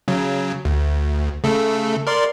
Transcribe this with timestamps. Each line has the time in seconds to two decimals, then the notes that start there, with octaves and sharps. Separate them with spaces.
0.08 C#3 F#3
0.65 D2
1.44 C#3 A3 A4
2.07 A#4 D5 C6